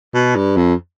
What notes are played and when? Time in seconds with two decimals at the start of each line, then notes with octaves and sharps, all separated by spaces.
0.14 B2
0.36 G2
0.57 F2